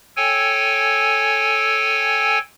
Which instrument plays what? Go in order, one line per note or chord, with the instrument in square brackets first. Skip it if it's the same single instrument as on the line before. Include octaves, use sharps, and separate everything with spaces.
[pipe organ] A4 C#5 G5 G#5